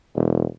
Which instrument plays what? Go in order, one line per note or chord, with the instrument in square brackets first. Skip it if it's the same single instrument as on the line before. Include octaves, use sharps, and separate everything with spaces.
[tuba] E1